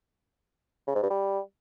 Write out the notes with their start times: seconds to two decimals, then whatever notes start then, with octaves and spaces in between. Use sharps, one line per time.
0.87 C#3
0.95 G#2
1.03 G2
1.10 G3